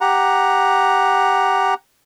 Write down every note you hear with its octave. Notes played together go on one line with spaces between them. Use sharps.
G4 F#5 A#5